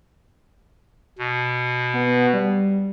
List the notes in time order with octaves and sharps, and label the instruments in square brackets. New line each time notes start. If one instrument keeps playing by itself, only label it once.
[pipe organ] B2
[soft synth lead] B3
G3